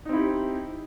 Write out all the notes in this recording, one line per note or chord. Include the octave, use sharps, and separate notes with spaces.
C4 D#4 E4 G4